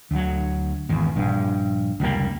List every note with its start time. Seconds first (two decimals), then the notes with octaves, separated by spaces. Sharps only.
0.11 D2 F#3
0.89 G#1 E2
1.16 A#1 G2
2.00 F1 C#2 G3 A#3